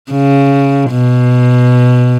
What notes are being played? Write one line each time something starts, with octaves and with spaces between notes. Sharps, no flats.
C#3
B2